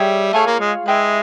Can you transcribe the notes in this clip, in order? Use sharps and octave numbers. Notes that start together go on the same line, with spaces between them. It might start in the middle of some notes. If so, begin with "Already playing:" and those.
Already playing: G3 G#4 C#5 E5 G5
A3 F4 G#4 C#5 F5
A#3
G#3
G#3 E4 G4 B4